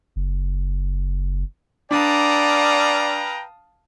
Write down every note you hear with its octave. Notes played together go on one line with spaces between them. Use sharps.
F#1
D4 B4 D5 F5 G5 A5 A#5 D#6